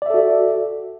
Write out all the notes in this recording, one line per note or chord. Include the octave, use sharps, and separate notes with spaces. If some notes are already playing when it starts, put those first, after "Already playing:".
F#4 A4 D5 E5